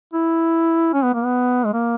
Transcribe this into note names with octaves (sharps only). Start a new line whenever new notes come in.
E4
C#4
B3
A#3
B3
G#3
A#3